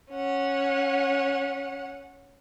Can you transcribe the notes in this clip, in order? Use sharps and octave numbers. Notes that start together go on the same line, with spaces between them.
C#4 F#5